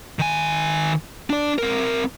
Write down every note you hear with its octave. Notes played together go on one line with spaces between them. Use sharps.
D#3 G#5
D4 D5
C4 A#4